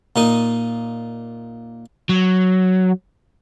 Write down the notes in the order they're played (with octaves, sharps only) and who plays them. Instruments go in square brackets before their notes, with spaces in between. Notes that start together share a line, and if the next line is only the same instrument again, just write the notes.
[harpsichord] A#2 D#4 D#5
[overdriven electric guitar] F#3